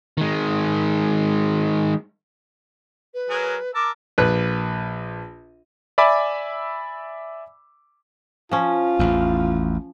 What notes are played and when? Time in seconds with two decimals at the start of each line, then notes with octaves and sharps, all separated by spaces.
0.18 D#3 G#3
3.14 B4
3.30 F#3 G#4 A#4
3.74 A#4 A5 D6 E6
4.18 A#1 B4 F#6
5.98 D5 E5 G#5 B5 D6 E6
8.51 F3 C#4 F4
8.99 A1 E2